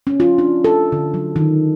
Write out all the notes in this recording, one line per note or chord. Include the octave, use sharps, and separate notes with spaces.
C#4
F4
D4
A4
D3
F#3
D#3